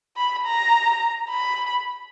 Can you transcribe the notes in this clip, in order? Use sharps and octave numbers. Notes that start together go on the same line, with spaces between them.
B5
A#5
B5